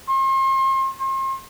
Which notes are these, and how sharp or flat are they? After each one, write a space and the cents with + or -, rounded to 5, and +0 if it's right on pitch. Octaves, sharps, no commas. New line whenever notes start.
C6 +40
C6 +40